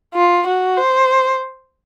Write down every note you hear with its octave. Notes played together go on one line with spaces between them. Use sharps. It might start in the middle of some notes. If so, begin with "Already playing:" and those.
F4
F#4
C5